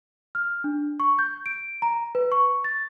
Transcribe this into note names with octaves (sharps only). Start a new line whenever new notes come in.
F6
D4
C#6
G6
D7
A#5
B4
C#6
A6